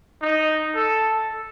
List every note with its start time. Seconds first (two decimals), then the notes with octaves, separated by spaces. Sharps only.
0.22 D#4
0.75 A4